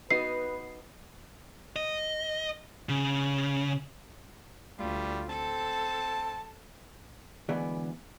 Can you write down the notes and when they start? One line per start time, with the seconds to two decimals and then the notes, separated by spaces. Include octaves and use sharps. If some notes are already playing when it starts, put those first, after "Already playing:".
0.10 B3 D#4 F#4 B4 C7
1.76 D#5
2.89 C#3
4.79 D2 G3 F4
5.29 C4 A4 A5
7.49 D2 E3 G#3 B3 G#4 D5